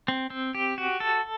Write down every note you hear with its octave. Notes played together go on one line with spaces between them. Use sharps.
C4
C4
G4
F#4
A4